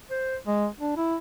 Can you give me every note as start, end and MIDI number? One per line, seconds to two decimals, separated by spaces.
0.11 0.36 72
0.47 0.67 56
0.80 0.96 62
0.97 1.17 64